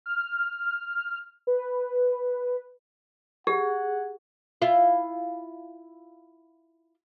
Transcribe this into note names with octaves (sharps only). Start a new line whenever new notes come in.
F6
B4
G4 G#4 F#5
E4 F4